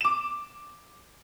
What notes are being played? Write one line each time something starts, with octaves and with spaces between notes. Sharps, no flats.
D6 E7